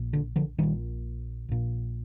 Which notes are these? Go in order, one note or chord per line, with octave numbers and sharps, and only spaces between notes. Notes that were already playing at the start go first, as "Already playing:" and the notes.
Already playing: A#1 A#2
D3
D3 F3
A#1 A#2 D#3 G3
A#1 A#2